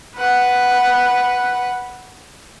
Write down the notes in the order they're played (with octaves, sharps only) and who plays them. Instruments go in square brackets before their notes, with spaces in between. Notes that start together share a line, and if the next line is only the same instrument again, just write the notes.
[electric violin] B4 F#5